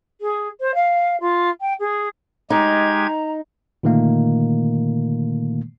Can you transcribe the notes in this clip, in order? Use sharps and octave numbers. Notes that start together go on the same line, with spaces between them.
G#4
C5
F5
F4
G5
G#4
G#3 D#4 G4 A#5 G#6
A#2 D3 D#3 A3 A#3